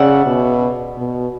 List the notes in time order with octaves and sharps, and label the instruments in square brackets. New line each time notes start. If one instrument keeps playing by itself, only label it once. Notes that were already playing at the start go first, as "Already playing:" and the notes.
Already playing: [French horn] C#3 [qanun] D5 E5 F#5
[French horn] B2
B2